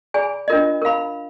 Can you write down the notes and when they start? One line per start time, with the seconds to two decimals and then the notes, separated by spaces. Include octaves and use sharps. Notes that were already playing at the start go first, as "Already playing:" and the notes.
0.14 G#4 D5 G#5 B5
0.48 D4 F4 A#4 D#5
0.82 A#4 F5 B5